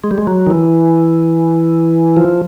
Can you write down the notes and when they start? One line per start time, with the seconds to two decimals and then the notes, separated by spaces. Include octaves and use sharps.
0.04 G#3
0.11 G3
0.18 G#3
0.27 F#3
0.47 D#3
0.50 E3
2.17 F3